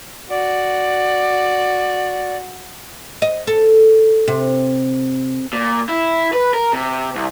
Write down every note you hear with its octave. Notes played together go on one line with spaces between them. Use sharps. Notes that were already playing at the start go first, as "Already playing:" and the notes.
F#4 D5
D#5
A4
C3
A#2
E4
B4
A#4
C3
C2